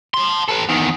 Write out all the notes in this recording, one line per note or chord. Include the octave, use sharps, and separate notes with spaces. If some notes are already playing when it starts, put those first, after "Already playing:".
A5 C6
A4 B4
E2 D#3